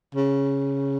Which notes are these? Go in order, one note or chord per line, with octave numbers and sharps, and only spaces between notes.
C#3